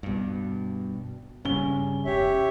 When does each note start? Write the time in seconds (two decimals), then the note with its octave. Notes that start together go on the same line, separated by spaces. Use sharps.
0.03 G2 B2
1.45 G2 C#3 C#4 G7
2.05 E1 G4 C#5 E5